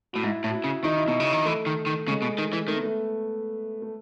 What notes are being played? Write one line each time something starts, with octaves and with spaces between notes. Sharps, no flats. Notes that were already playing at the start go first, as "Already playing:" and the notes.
A2 F#4
G#2 E4
A2
F#4
E4
C#3
D#3 D#4
E4
B2 D#4
C#3
D#3
E3 A3
D#3
D#3
C#3 G#3
B2
D#3
E3
D#3 A3
B3
A3
A3